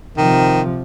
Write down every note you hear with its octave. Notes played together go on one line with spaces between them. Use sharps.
C3 D#3 F3